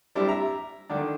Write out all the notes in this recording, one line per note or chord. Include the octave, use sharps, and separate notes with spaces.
G3 C4 D4 E4 G4
E5 A#5
D3 D#3 D4